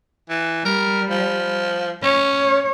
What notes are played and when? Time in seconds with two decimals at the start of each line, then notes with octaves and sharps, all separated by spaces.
0.29 E3
0.65 G3 A#4
1.10 F3
2.03 C#4 C#5